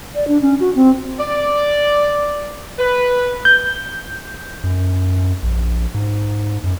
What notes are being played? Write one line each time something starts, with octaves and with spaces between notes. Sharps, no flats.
D5
D4
C#4
F#4
C4
D5
B4
G6
F#2
A#1
G#2
F#2